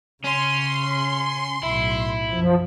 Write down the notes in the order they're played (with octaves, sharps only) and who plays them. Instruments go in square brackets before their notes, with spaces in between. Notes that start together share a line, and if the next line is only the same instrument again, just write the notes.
[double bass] C#3 [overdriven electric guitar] C#4 [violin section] C6
[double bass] B1 A2 [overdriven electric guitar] E4
[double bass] F#2 [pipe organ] F3